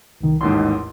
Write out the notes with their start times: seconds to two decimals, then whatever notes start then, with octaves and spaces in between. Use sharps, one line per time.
0.21 C2 D#3
0.41 A1 D#2 G#2 C6